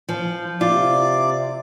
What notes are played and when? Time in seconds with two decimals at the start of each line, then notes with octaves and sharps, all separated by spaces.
0.09 F3
0.61 C3 F4 D5